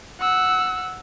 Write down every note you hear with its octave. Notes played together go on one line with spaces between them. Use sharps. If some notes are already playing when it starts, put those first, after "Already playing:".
F#5 E6